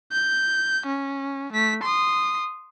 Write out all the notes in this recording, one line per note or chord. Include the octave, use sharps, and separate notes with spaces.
G6
C#4
A3 B6
C6 D#6